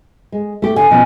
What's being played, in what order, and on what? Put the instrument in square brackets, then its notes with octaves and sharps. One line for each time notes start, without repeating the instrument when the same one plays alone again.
[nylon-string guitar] G#3
A3 G4
[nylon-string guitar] D3 [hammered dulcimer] G#5
[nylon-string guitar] B2 F3 C#4